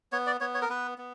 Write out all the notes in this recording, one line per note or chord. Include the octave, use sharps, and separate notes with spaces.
B3 C#5
D5
B3 C#5
C#5
A#4
B3 B4
B3